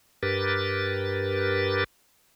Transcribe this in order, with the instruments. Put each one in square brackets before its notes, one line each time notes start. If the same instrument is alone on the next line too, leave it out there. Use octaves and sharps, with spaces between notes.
[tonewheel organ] G2 G4 A#4 B4 A6